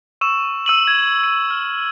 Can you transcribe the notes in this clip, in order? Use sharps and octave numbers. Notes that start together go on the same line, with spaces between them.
C#6 E6 E7
E6 D#7 F#7
G#6
D#7
F6